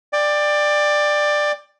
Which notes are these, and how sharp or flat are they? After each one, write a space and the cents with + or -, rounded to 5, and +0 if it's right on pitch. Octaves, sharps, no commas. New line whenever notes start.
D5 +15 G5 +25